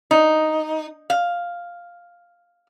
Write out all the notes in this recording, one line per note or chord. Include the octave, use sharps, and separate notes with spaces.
D#4
F5